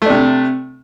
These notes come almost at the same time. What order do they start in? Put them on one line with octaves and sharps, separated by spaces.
A3 D4 C3